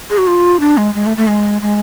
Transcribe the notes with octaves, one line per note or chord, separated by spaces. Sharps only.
G#4
F#4
F4
D4
G#3
G#3
A3
A3
G#3
G#3